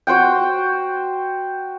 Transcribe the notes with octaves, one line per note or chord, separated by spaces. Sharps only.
F#4 C5 F#5 G5